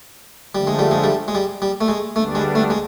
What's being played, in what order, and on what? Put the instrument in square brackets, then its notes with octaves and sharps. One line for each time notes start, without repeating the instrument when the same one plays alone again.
[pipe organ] D3 F3 A3 [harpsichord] G3
[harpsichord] G#3
G3
G#3
G3
G#3
G3
G3
A3
G#3
[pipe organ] D2 D3 G3 B3 D4 [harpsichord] A3
[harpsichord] G#3
A3
G#3